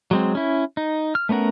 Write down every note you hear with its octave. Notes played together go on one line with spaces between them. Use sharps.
F#3 G#3 C4
C#4 E4
D#4
F6
A3 B3 C#4 A#4 F#5